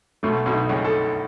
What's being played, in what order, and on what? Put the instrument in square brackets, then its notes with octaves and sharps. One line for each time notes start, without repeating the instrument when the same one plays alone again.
[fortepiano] B1 B2 [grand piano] A3
[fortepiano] B1 B2
[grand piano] D#4
[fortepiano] C#2 C#3
[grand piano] A4